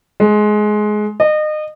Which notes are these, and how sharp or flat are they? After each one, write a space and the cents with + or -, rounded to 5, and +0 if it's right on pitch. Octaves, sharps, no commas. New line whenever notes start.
G#3 +20
D#5 -30